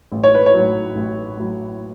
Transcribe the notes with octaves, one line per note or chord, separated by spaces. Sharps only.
A1
C#5
B4
C#5
A2 F#3
A1
A2 F#3